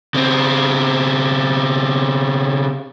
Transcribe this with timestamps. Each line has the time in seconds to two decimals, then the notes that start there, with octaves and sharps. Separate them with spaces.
0.15 C#3 C4